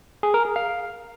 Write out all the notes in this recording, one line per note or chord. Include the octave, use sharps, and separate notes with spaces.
G#4
A#4
G#4
F5